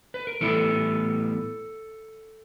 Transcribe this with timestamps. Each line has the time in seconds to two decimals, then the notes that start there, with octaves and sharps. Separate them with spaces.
0.14 B4
0.27 A#4
0.41 A2 E3 G3 B3 E4 A4